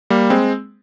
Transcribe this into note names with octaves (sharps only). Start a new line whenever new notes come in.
G3 A#3
G#3 C4